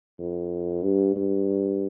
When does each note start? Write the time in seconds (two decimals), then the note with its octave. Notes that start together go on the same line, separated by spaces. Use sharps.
0.19 F2
0.83 G2
1.16 G2